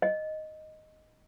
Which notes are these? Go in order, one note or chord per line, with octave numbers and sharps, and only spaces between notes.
D#5